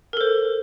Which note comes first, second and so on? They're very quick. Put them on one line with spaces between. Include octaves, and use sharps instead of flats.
A#4 A4 C5